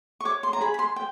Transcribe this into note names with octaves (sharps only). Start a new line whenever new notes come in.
C#6
C#5 D6
C6
A#5
G#4 B5
B5
C6
G5